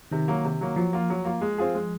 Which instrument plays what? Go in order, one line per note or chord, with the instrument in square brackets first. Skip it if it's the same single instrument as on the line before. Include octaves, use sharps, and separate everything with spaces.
[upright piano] C3 [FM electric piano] D#3
[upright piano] F#3 A#3
C3
F#3 A#3
[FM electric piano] F3 [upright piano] F#3
[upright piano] A#3 F4
F#3
A#3 F4
G#3
C4 F4 G#4
G#3